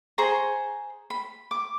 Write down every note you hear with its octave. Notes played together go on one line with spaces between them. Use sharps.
G#4 C5 A#5 C#6
B5
D6